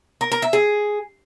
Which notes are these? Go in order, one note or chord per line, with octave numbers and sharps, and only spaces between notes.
A#4
A#4
E5
G#4